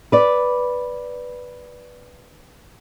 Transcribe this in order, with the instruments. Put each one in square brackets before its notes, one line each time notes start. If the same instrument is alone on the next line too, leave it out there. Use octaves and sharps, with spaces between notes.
[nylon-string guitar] B4 D5